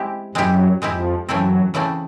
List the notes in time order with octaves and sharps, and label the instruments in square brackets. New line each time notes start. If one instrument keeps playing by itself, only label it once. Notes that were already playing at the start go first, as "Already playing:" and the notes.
Already playing: [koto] G#3 C4 E4 G4
[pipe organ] F#2 F#3 [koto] G#3 C4 E4 G4
[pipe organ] F2 F3 [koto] G#3 C4 E4 G4
[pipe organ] F#2 F#3 [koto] C#3 E3 A3 C4 E4
[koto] C#3 E3 A3 C4 E4